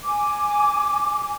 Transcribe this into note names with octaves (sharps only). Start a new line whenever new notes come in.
G#5 D6